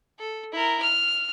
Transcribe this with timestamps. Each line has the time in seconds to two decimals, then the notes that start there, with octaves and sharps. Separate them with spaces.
0.19 A4
0.53 E4 A#4
0.82 F6